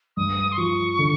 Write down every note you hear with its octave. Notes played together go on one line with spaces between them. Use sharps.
G2 D#6
C6
F3 C#6
D3